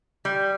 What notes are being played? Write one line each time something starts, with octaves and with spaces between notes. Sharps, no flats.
G3